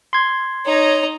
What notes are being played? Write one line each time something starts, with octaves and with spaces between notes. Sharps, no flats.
C6 G#6
D#4 C#5 A#5